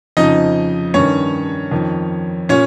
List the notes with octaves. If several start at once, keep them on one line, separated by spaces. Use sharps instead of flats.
F2 C#3 F3 D#4 D#5
G2 D#3 C#4 C#5
F2 D#3
A#2 C#4 C#5